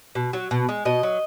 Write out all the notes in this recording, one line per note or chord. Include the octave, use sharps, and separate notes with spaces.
B2
F#3
B2
G#3
B2 D#5
F#3